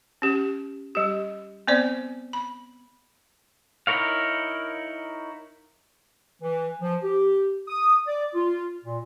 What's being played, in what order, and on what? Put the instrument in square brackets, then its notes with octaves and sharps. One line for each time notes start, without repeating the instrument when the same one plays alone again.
[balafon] C#4 G4
G3 G4
B3 C4 C5 D5
B5
[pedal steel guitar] D#4 E4 A#4 C#5 F5
[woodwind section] E3
F3
G4
D#6
D5
F4
A#2